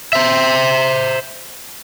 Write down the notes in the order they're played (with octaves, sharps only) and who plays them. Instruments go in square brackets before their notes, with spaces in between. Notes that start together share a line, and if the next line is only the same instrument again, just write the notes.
[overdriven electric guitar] C5 E5